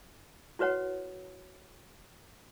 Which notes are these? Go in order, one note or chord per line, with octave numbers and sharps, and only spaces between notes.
E4 F#4 B4 C#5 F#5